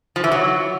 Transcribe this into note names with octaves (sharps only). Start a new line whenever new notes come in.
F3
E3
F#3